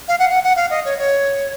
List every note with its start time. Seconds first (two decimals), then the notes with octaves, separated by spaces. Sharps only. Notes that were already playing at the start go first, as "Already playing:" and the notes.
0.08 F5
0.19 F#5
0.29 F#5
0.43 F#5
0.56 F5
0.70 D#5
0.85 C#5
0.98 C#5